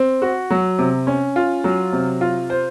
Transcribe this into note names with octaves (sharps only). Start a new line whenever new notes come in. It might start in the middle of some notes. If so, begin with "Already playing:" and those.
Already playing: C4
F#4
F#3
C3
C#4
F4
F#3
C3
F4
C5